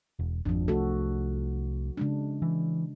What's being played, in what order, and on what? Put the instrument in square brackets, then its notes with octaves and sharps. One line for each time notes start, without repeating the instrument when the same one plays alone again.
[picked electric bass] E1
[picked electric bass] G#1 F2 [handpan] F3 D4
[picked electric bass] C2 A3 [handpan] F#4 A4
[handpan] C#3 G#3 D4
[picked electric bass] E3